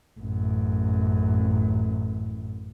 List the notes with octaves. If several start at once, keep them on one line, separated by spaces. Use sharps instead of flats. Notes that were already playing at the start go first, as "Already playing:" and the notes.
A1 F#2